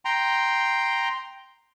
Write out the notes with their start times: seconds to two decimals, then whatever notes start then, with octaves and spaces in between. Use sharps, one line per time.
0.05 G5 A#5 C6